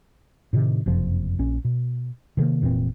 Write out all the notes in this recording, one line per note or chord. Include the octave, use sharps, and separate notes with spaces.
A2 C3 D#3
F#1 F2 C3 F3
A#1 C#4
B2
C3 D#3 G#3 A#3
F1 A#2 E3 C4